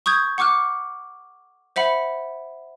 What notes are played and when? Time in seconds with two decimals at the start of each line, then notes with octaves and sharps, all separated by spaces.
0.06 C#6 D#6 G6 G#6
0.38 F#5 C#6 D6 F6 F#6
1.76 C5 E5 F#5 B5